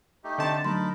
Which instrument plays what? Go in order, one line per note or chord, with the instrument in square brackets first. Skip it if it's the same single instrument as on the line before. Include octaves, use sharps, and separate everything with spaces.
[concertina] A3 D#4 G4
[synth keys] D3 A5 [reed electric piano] C4 D#5 C6
[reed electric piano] F#3 A3 [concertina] D#4 A#4 B5 [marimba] C6